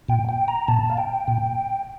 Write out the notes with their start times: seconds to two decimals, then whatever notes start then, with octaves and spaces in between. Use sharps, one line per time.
0.09 A#2 G5
0.29 G5
0.48 A#5
0.68 A#2 A5
0.90 F5
0.98 G5
1.28 A#2